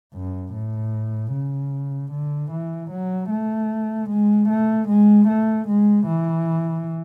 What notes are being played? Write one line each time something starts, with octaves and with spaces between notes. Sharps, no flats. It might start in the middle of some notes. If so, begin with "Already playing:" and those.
F#2
A2
C#3
D3
E3
F#3
A3
G#3
A3
G#3
A3
G#3
E3